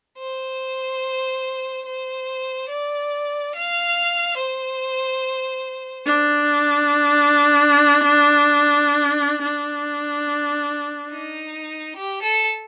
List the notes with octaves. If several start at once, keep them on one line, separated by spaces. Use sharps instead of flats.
C5
C5
D5
F5
C5
D4
D4
D#4
G4
A4